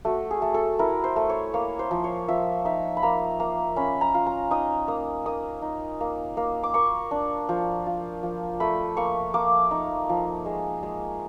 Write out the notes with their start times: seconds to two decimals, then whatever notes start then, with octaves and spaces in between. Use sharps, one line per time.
0.05 A3 F#4
0.31 G#4
0.42 A3
0.54 A4
0.79 E4 A#4
1.04 C5
1.16 A3
1.30 C#5
1.54 A#3 C#5
1.79 C5
1.91 F3
2.04 C#5
2.28 F3 E5
2.65 D#4 E5
2.97 B5
3.03 A#3 A#5
3.40 A#3 A#5
3.76 C#4 B5
4.01 A#5
4.14 F4
4.26 A#5
4.51 D#4 D#6
4.88 A#3 D#6
5.26 A#3 D#6
5.62 D#4
6.01 A#3
6.37 A#3
6.63 D6
6.74 A#3 C#6
7.11 D4
7.49 F3
7.86 F4
8.23 F3
8.60 A3 B5
8.97 A#3 C#6
9.34 A#3 D6
9.71 D#4
10.09 F3
10.46 G#3
10.83 G#3